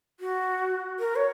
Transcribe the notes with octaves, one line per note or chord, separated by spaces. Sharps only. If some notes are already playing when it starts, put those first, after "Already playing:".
F#4
A#4
C#5